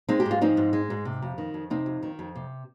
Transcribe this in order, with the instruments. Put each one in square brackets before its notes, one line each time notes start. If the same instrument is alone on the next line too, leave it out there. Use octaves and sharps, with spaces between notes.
[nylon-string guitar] G#3 C4 D#4
G4
G#2
F4
F3 C4 D#4
G#2
G#3
G#2
C3
F2
D#3
F2
C3 C4 D#4
F2
D#3
F2
C3